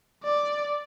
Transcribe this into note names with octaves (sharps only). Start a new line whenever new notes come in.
D5